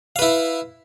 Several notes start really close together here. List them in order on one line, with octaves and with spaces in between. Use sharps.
F5 B4 E4